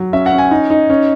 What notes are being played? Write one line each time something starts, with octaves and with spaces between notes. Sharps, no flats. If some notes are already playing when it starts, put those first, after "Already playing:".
Already playing: F#3
C#4 E5
F#5
C#4
G#5
D#4
D#4
C#4